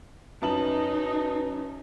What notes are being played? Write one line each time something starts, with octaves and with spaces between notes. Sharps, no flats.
F#2 D#4 B4 A5 F#7